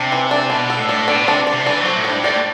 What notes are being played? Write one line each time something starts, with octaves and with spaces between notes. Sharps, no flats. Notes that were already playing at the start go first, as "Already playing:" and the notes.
Already playing: C3 D4
E3
D4
B2 D4
A4
A2
D4
B2 D4
C3 D4
D4
C3
E3 D4
F#3 C5
A2
D4
G2
A2 D5